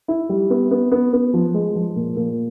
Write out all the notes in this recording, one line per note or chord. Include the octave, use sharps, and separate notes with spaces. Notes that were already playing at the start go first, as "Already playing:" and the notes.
E4
G3
B3
B3
B3
B3
F3
G#3
F3
A#2
A#2